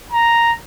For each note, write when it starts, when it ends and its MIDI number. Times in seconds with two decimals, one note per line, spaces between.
0.12 0.52 82